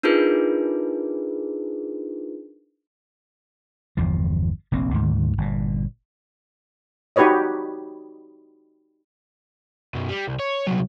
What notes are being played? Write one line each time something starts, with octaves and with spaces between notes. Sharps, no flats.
D4 D#4 F4 G#4 A#4 B4
G1 E2 F3
F1 A#1 A#3 C4
D2 G#2 D#3
G1 A#2
D#4 F#4 G4 B4 C#5 D#5
F#2 B2
G3
C2
C#5
C2 F#3